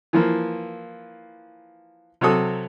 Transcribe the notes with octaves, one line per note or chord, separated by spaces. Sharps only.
E3 F3 A#3
C3 F#3 F#4 A4 D#6